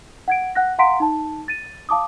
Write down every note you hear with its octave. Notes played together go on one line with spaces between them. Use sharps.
F#5 G#6 D7
F#5 F#6 A#6
F5 F#5 A#5 C6 B6 D7
D#4 A5
A6 D#7
F5 A5 D6 D#6